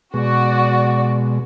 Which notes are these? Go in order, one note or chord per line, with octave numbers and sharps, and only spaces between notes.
B2 G#3 F#4 D5